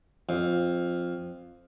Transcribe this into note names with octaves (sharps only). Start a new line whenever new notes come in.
F2